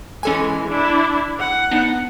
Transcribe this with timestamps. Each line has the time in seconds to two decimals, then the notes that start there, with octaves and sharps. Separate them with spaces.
0.23 E3 G#3 C#4 A4 G#5
0.68 D4 E4
1.39 F#5
1.71 B3 D4 D#4